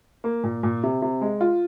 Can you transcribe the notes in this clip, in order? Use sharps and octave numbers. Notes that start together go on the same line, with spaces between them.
A#3
A#2
A#2
C3
C3
G#3
F4